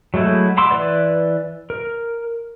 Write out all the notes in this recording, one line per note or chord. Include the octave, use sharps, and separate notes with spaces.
F#3 G#3 A3 E4 F#4
F#5 B5 C6 D6 E6
E3 B4 D5
A#4